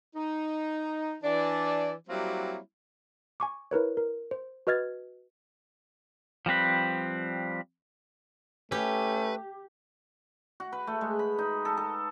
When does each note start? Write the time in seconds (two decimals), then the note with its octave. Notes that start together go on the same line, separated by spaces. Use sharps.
0.16 D#4
1.24 E3 D4 D5
2.09 F#3 G3 A#3 C4 E4 F#4
3.40 G#5 C#6 D6
3.71 E4 A#4 B4 C#5
3.97 A#4
4.31 C5
4.67 F#4 B4 D#5 F6 G#6 A6
6.46 F3 G3 C4 B4
8.72 A3 C#4 G4 B4
10.60 F#4
10.72 B4
10.87 A3
11.01 G#3
11.19 B5
11.38 D#4
11.65 A4
11.77 A4